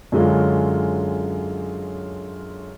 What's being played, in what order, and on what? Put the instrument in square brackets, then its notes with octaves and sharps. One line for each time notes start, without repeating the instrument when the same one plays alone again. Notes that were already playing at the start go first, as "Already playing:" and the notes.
[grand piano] F#2 D3 G#3 C#4 F4